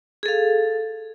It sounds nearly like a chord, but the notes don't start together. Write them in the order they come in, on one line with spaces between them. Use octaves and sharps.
G#4 A4 F5